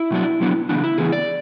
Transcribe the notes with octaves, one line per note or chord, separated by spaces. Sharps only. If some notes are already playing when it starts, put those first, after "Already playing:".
Already playing: E4
B2 F#3 B3 D4
B2 F#3 B3 D4
C#3 E3 B3 D4
E4
C#3 E3 B3 G#4
D5